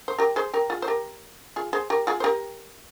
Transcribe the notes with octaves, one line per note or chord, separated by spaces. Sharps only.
C5
G4 A#4
G#4 C5
G4 A#4
F4 G#4
C5
G4 A#4
F4 G#4
G#4 C5
G4 A#4
F4 G#4
C5
G4 A#4